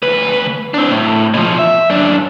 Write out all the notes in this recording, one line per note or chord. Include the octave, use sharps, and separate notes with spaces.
D2 B4
C4 D4
A2
B2 F3
E5
F#2 D4